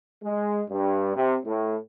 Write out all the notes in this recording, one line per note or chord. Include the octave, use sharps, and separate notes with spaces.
G#3
G2
C3
A2